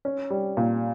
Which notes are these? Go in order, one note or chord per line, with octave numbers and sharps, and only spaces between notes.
C#4
G3
A#2